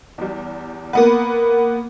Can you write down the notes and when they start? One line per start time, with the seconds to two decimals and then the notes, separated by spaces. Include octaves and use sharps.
0.18 E2 G3
0.93 A#3 B3 A#4 B4 F#5